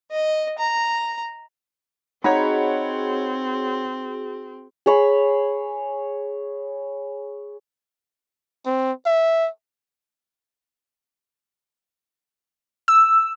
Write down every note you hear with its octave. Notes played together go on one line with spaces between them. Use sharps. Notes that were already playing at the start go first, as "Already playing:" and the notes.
D#5
A#5
C4 D#4 F#4 G#4 C#5 F#5 B5
G#4 C#5 B5
C4
E5
E6